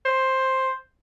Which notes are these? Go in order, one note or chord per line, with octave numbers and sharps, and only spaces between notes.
C5